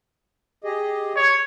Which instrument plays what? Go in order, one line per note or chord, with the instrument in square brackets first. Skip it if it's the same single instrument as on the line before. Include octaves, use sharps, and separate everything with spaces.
[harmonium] G4 G#4 D#5
[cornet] C#5